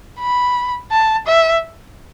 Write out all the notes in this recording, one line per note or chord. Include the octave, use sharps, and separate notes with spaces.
B5
A5
E5